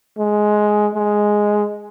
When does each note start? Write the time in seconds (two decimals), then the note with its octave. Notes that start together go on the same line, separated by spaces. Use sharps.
0.18 G#3
0.95 G#3